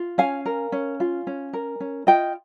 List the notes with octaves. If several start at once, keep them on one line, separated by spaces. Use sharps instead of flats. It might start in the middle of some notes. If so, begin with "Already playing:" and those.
Already playing: F4
C#4 F5 G#5
A#4
C#4
F4
C#4
A#4
C#4
F4 D#5 G5